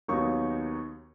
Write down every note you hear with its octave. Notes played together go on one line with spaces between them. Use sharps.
D#2 D#3 F#3 B3 D#4 C#6